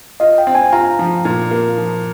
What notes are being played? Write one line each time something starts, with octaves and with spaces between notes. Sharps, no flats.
F4 D#5
G5
C4
G#5
F4 A#5
F3
A#2
A#3
F3